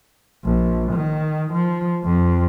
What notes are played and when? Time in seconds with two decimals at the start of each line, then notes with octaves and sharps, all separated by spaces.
0.44 A#1
0.93 D#3
1.52 F3
2.04 F2